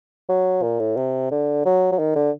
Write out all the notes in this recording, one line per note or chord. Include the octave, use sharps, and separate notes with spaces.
F#3
A#2
A2
C3
D3
F#3
F#3
D#3
D3